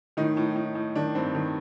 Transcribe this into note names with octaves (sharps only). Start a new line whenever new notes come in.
A2 D#3 D#4
A2
A2
A2
D#3 D4
G2 C4
D#3